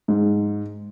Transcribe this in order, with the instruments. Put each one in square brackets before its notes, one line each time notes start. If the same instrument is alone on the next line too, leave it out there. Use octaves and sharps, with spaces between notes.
[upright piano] G#2